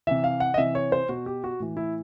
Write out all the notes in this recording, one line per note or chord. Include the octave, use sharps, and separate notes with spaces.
C3 E3 E5
F5
F#5
D#5
C3 E3 E5
C#5
C5
B2 F#4
G4
F#4
A2 E3
E4